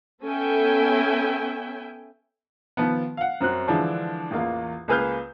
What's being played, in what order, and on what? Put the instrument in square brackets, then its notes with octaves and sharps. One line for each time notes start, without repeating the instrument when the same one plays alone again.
[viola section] B3 C#4 A4 E5 G5 G#5
[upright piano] D#3 F3 B3
F5 F#5
F#2 C4 F#4 F#6
D3 E3 F3 G#3 D4
A1 E2 A#3 F4
C#2 A#3 G#4 B4 F6 G6